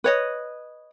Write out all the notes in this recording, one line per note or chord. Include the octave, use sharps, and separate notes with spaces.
B4 C#5 D#5